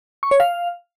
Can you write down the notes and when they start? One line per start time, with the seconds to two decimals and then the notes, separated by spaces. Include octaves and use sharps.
0.23 C#6
0.31 C#5
0.40 F5